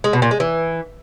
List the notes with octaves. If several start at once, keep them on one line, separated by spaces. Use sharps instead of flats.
G#3
B2
A#2
G#3
E3